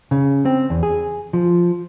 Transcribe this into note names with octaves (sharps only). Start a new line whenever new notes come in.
C#3
C4
E2
G#4
F3